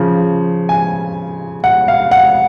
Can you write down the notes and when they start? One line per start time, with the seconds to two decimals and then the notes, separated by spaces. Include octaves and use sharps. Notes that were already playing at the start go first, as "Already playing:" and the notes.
Already playing: C#3 F3
0.69 G#5
1.64 F#5
1.88 F5
2.11 F#5